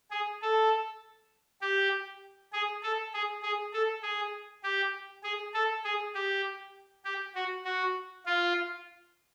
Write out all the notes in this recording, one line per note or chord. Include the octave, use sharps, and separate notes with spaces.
G#4
A4
G4
G#4
A4
G#4
G#4
A4
G#4
G4
G#4
A4
G#4
G4
G4
F#4
F#4
F4